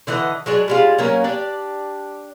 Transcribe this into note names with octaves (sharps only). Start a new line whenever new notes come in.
D3 E3 D#5 F#5
F#3 G#3 D4
G3 G#3 F4
F#3 A#3 C#4
D4 G4 D5